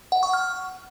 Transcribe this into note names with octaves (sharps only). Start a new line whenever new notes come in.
F#5
C#6
F6